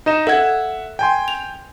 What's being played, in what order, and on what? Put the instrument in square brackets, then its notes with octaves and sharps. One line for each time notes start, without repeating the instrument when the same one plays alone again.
[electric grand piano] D#4 D#5 E7
[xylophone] A4 G#6 [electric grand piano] E5 F#5
[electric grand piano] G5 G#5 C6
[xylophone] F7